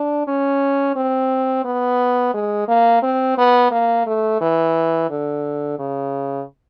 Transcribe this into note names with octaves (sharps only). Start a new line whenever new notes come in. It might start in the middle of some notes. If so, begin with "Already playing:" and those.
Already playing: D4
C#4
C4
B3
G#3
A#3
C4
B3
A#3
A3
E3
D3
C#3